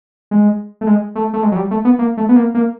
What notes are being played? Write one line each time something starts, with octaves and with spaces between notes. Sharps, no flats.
G#3
A3
G#3
A3
A3
G#3
F#3
G3
A3
B3
A#3
A3
B3
A#3
A#3